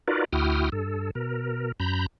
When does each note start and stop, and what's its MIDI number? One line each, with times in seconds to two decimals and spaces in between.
0.08 0.25 63
0.08 0.25 65
0.08 0.25 66
0.08 0.25 70
0.08 0.25 71
0.08 0.25 74
0.33 0.70 38
0.33 0.70 64
0.33 0.70 66
0.33 0.70 79
0.33 0.70 87
0.33 0.70 89
0.72 1.11 43
0.72 1.11 69
1.15 1.72 47
1.15 1.72 70
1.80 2.06 42
1.80 2.06 82
1.80 2.06 83
1.80 2.06 91